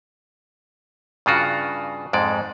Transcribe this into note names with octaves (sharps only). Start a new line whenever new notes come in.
G2 C#3 F4 F#4
F2 G#2 G#3 D5